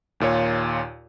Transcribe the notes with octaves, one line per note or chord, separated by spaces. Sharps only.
D#2 A#2 F4 C#5